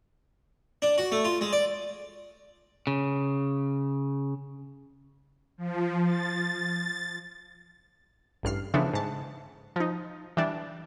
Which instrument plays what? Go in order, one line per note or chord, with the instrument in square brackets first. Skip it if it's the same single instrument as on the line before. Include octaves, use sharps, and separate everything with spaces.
[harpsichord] D4
F#4
A3
F4
G#3
D5
[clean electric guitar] C#3
[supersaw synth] F3
A6
[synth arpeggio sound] A1 G2 F6 C7
C#3 E3 F3 A3 B3 D4
G#2 A5
F3 D#4
E3 G3 D4